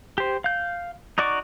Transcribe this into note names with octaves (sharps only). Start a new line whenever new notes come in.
G4 C5
F5 G6
D#4 F#4 D5 C#6 D6